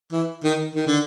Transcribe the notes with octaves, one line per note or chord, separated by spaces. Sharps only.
E3
D#3
D#3
D3